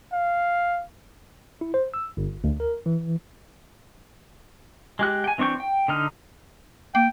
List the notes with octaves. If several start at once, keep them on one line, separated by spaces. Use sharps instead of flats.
F5
E4
C5
E6
G1
D2
A#4
E3
G#3 G4 F#6
G5 G#5
E3 C4 D4 C#6 G6
G5
D3 D#4 F6
A#3 G5